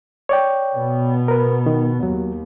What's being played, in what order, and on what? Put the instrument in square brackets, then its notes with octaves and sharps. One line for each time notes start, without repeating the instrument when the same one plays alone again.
[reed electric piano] C#5 D5 G5
[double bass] B2 B3
[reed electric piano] A#4 B4
D#3
[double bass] D#2 [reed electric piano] F#3